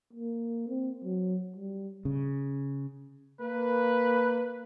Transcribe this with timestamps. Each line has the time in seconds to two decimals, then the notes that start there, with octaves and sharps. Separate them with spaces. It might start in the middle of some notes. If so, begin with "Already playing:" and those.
0.13 A#3
0.68 C4
1.04 F#3
1.56 G3
2.05 C#3
3.40 A#3 B4